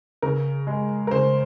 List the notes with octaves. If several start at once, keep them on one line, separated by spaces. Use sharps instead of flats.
C#3 A#4
G#3
A#4
C#3 C5